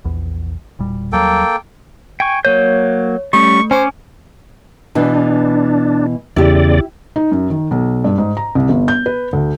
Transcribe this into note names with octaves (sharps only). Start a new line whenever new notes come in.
A#1 E2
E1 A#2 G3
D#2 F#3 G3 A#3 A4 G5
G5 G#5 C#6
F#3 A#3 C#5 G6
G3 A3 C#4 C#6
C#4 C5 C#5 G#5 D6
B2 E3 D4
E2 C#3 E4 G4 D5
D#4
F#2
D#3
B1
G2
G#2
A#5
C2
G1
G6
B4
D2